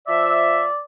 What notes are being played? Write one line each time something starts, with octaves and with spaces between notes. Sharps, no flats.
F3 D5 E5